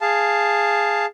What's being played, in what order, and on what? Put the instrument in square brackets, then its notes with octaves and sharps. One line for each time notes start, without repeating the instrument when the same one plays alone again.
[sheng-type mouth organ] G#4 F5 A5